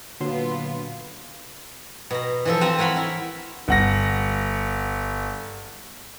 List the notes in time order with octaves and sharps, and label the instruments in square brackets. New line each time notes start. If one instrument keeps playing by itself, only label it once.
[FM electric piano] A#2 F#3 C6 [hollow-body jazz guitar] D3 [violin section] B3 F4
[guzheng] B2 A#5
E3 F3 A4
C4 B4 E5 A#5
A#4 C#5 F#5 B5 C6
E4
[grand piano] G1 F#5 A#6